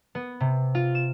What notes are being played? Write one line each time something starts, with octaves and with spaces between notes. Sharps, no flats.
B3
C3
F4
E7